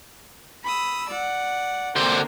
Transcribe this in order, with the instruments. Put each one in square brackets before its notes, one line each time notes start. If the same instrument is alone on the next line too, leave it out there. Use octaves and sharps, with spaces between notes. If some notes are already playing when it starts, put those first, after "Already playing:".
[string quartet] B5 D#6 E6
D5 F#5
[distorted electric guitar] D3 C5 [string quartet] A#3 C4